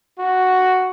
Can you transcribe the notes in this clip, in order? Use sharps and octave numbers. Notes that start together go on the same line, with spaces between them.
F#4